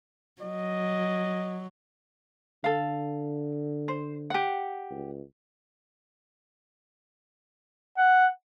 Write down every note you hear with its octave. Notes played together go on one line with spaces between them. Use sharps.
F#3 D#5
D3 A4 F5
C5
G4 F#5
C#2
F#5